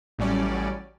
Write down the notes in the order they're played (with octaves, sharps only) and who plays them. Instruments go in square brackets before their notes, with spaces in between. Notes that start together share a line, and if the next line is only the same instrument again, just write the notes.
[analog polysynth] A1 A2 F#3 G3 C#4 D5